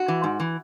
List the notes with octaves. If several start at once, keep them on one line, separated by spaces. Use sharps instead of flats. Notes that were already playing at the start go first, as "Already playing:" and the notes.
Already playing: F#4
E3
G#2
E3